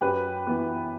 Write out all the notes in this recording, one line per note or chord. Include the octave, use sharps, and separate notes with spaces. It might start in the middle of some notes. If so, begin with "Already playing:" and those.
F#2 G4 B4
E3 B3